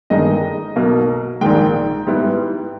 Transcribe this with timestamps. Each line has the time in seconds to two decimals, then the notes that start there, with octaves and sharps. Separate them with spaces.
0.10 G1 G2 D#3 G#3 D#4 D#5
0.76 B1 B2 A#3
1.41 A#1 G#2 D#3 G#3 G5
2.07 G#2 G3 B3 E4